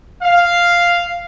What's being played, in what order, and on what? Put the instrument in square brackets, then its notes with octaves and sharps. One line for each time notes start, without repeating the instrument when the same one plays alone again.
[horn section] F5